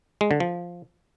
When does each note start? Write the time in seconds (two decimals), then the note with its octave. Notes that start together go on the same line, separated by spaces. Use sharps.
0.21 G#3
0.31 D3
0.40 F3